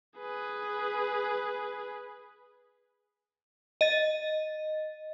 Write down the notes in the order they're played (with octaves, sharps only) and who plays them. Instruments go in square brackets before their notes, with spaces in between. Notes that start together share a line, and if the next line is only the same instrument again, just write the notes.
[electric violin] G#4 B4
[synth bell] D#5 A6